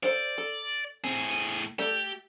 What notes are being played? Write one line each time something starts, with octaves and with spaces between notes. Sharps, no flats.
A4 C5 D5 F5
A4
A2 C4 G#4
A3 G4 A4 D5